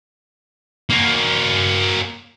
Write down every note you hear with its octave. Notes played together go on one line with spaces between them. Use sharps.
A#3 F#4